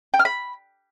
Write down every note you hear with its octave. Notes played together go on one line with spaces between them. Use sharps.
G5
F6
B5